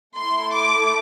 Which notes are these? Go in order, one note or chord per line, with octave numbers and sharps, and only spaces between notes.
A3 E4 A4 C6
D6